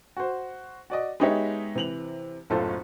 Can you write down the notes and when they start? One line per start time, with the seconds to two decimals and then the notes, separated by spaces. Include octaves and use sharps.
0.17 F#4 C5
0.90 F#4 D5 D#5
1.20 G#3 B3 D#4 G4 C#5 E5
1.75 C3 E3 F7 F#7
2.50 F#1 B1 A2 F4 A4 C5